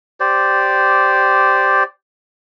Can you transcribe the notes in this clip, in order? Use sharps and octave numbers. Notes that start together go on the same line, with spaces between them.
G4 C5 D5